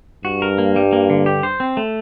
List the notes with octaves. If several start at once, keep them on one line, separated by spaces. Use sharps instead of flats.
G2 F#4
A#4
A#3
G3
A#3
D3
G4
C5
C4
A3